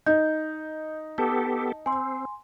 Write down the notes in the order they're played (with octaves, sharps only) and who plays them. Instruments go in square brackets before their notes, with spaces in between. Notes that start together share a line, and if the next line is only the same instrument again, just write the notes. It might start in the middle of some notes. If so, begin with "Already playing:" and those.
[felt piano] D#4 [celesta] D#5 G6
[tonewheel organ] B3 G4 A4 [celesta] A5
[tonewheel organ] C4 [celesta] G#5 C6